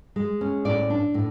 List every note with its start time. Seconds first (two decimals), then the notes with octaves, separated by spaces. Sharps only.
0.16 G#3
0.41 C#4
0.65 A2 D5
0.90 D4
1.14 A2